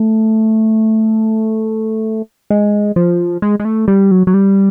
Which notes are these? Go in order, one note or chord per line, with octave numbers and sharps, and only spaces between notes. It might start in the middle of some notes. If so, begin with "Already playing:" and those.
Already playing: A3
G#3
F3
G#3
G#3
A3
G3
F#3
F#3
G3